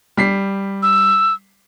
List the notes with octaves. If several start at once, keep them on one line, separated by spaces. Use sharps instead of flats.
G3 B6 C7
E6